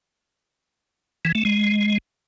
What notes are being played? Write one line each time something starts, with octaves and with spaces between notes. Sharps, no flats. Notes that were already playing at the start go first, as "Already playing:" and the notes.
E3
A3
G#3